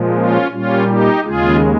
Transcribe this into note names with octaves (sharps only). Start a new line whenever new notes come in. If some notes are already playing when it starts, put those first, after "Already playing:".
Already playing: A#2 F3 G#3
C#4 F4
A#2 G3 C#4 F4
D#4 G4
D#2 C#3 G#3 F4 G#4